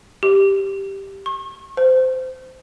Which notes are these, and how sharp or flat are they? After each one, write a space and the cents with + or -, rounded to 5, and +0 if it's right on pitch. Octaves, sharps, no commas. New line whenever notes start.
G4 +0
C#6 -35
C5 -20